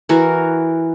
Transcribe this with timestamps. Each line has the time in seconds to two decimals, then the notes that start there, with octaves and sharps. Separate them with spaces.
0.09 E3 F#4 A#4